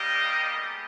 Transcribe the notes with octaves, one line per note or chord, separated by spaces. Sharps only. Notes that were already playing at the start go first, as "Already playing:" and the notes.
Already playing: G3 A#3 D#4 G4 D#5
G#3 B3 G4